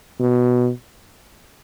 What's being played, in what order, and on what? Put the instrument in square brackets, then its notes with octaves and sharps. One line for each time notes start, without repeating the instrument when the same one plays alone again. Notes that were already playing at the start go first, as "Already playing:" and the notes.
[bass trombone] B2